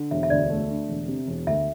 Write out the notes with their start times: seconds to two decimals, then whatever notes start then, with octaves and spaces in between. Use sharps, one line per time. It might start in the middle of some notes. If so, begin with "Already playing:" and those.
Already playing: D3
0.11 E1 E5
0.23 E5
0.30 D2 D5
0.50 A3
0.70 D3
0.88 E1
1.08 C3
1.27 E1
1.47 D2 E5